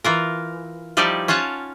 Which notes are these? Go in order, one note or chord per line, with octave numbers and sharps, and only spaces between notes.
E3 F4 A#4
F3 G3 D#4 E4 G4 D5
C#4 F4 C#5 F#5 A5